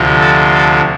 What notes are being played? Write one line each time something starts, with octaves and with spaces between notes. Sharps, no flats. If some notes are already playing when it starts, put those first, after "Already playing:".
Already playing: D2 C3 F3
A4
A4